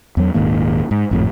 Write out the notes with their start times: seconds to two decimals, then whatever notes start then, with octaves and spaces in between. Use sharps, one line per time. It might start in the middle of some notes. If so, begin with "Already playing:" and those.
0.17 E2 F#3
0.34 D#1 G#2 D#3 A#3
0.91 G#2
1.11 G#1 F2 A2